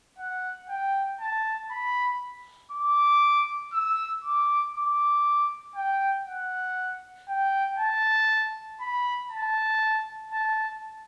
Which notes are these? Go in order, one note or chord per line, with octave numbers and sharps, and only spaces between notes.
F#5
G5
A5
B5
D6
E6
D6
D6
G5
F#5
G5
A5
B5
A5
A5